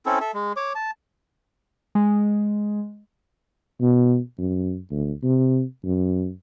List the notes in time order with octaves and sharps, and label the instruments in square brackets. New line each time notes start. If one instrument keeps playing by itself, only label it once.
[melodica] C4 C#4 E4 A4
A4 E5
G#3
C#5 D6
A5
[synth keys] G#3
[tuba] B2
F#2
D2
C3
F#2